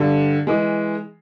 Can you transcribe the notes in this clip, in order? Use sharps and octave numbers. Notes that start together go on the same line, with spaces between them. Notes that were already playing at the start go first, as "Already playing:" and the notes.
Already playing: G2 D3 G3
E3 G#3